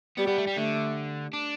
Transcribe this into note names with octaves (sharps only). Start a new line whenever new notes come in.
G3 B3
B3
A3
G3
D3 A3
D4